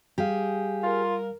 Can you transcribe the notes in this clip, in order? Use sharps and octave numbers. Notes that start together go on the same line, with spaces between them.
G3 G4 G#4 F5
F4 A#4